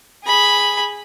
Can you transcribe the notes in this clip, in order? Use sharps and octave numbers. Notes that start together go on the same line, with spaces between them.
G#4 B5